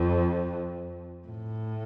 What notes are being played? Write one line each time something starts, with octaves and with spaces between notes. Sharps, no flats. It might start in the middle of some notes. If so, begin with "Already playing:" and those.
Already playing: F2
A2